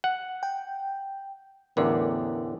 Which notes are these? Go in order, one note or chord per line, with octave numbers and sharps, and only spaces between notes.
F#5
G5
A1 E2 D3 A#4